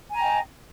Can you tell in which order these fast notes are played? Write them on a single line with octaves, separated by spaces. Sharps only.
G#5 A#5 G5 D#5